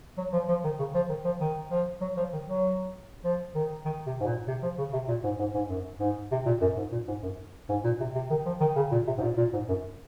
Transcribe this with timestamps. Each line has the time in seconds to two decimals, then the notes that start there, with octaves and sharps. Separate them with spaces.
0.17 F#3
0.33 F3
0.48 F3
0.64 D#3
0.79 C#3
0.95 F3
1.09 D#3
1.25 F3
1.41 D#3
1.71 F3
2.01 F#3
2.17 F3
2.33 D#3
2.47 F#3
3.24 F3
3.55 D#3
3.85 D#3
4.06 C3
4.20 G#2
4.27 A#2
4.47 C3
4.62 F3
4.78 C#3
4.93 C3
5.08 A#2
5.24 G#2
5.39 G#2
5.54 G#2
5.69 F#2
6.00 G#2
6.31 C3
6.46 A#2
6.61 F#2
6.77 G#2
6.92 A#2
7.08 G#2
7.23 F#2
7.69 G#2
7.84 A#2
8.00 C3
8.15 C3
8.30 D#3
8.46 F3
8.61 D#3
8.76 C#3
8.92 A#2
9.07 C3
9.18 G#2
9.23 A#2
9.37 A#2
9.53 G#2
9.68 F#2